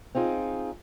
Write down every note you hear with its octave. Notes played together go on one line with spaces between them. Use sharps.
C4 D#4 F4 G#4